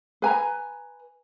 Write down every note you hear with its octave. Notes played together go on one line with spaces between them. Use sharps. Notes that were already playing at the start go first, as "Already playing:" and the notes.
B4 G#5 A#5